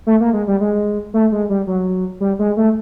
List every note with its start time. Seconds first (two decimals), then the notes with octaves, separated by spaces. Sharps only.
0.07 A3
0.20 A#3
0.33 G#3
0.47 G3
0.61 G#3
1.14 A3
1.32 G#3
1.49 G3
1.67 F#3
2.20 G3
2.39 G#3
2.57 A3